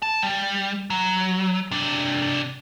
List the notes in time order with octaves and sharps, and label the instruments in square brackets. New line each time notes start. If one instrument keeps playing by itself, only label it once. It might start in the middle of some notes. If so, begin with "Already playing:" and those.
[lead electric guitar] A5
G3
F#3
C3 D4